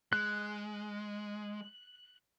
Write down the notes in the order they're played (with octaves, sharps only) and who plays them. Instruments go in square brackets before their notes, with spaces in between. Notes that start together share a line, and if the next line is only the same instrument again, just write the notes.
[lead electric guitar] G#3 [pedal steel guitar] F#6